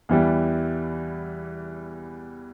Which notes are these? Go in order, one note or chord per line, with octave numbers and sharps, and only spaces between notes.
E2 E3 G3